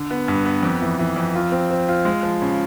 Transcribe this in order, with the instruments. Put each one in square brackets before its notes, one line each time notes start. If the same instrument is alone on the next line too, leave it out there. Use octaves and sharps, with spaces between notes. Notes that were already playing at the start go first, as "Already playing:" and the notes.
Already playing: [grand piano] D3
B3
G2
B3
F2
E3
E3
F2
F4
C4
C4
F4
G#3
F3
C#3